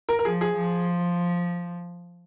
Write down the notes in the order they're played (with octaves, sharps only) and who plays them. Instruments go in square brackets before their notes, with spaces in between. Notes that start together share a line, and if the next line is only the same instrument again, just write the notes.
[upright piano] A#4
A#4
[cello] F3 [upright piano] G#4
[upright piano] G#4
[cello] F3